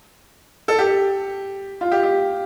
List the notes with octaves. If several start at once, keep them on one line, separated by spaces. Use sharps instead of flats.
A4
G4
F4
G4
G4